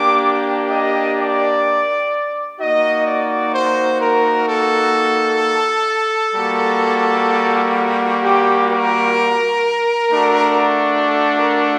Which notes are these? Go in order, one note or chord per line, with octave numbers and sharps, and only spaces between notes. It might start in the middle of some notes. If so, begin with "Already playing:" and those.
Already playing: A#3 D4 G4 D6
D#5
D5
A#3 D#4 F#4 D#5
D5
C5
A#4
A4
G3 A#3 F#4
G4
A#4
A3 D4 F#4
A4
A#4